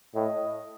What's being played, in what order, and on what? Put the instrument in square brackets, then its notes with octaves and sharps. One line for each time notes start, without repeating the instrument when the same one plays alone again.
[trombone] A2 [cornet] D#5